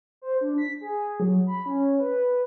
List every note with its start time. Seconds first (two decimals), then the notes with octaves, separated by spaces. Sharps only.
0.22 C5
0.41 D4
0.58 B6
0.81 G#4
1.20 F#3
1.47 B5
1.66 C#4
1.99 B4